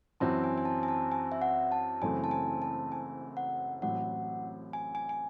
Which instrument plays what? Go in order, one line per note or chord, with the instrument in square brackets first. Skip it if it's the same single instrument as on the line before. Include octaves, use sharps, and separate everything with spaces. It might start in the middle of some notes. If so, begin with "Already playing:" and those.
[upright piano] F#2 E3 C4 F#4 [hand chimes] A5
[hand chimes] G#5
G#5
A5
G#5
A5
G#5
E5
F#5
A5
[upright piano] F#1 F#2 E3 A3 C4 [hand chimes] G#5
[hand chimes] A5
G#5
A5
G#5
F#5
[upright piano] A1 A2 F#3 C4 [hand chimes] F#5
[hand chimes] G#5
G#5
G#5